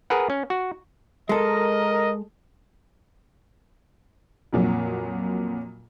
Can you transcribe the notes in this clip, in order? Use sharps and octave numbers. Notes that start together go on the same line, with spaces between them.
G#4 A#4 B4 F#5
C#4
F#4
G#3 A4 A#4 D#5
F2 A#2 F#3